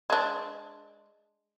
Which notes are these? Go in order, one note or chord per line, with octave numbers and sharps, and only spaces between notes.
G#3 D4